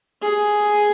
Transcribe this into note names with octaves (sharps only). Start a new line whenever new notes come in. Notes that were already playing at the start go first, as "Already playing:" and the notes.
G#4